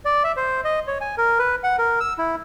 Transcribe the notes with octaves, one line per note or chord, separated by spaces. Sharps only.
D5
E5
C5
D#5
C#5
G#5
A#4
B4
F#5
A#4
E6
E4